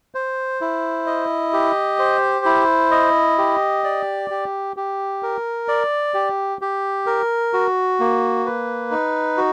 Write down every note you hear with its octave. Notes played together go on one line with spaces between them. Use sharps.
C5
E4
D#5
G4
C5
E4
D#5
G4
D5
G4
G4
A#4
D5
G4
G4
A#4
F#4
A#3
B4
D#4
F#4